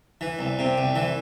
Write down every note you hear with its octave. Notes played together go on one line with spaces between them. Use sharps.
E3
C2
C3
C2
E3